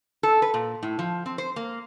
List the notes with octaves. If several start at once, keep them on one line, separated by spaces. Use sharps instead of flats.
A4
B4
A#2
A2
F3
C4
C5
A#3